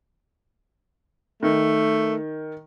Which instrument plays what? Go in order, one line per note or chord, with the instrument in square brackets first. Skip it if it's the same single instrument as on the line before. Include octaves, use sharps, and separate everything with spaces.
[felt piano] D#3 [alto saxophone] A3